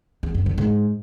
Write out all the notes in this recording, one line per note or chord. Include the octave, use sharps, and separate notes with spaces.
E2
F#2
D3
G#2